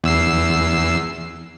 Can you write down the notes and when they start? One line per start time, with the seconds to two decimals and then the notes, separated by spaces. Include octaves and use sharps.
0.04 E2 E6 C7